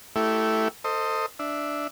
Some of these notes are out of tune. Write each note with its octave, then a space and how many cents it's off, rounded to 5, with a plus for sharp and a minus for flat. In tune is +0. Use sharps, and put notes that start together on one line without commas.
A3 +0 E4 +0 G4 -25
A4 +30 C5 +0 D#5 +0
D4 +0 E5 +0